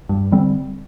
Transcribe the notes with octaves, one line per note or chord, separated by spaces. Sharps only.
G2
D3 G3 C4